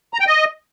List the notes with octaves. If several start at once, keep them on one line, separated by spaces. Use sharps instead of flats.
A#5
G5
D#5